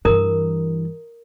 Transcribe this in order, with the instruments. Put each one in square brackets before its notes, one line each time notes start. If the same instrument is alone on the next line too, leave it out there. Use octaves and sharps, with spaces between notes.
[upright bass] G2 E3 [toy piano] A#4 A#5 D#6